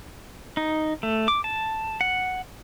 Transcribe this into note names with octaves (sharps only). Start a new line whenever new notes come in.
D#4
A3
D6
A5
F#5